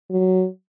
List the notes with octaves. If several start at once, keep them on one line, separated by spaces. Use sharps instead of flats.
F#3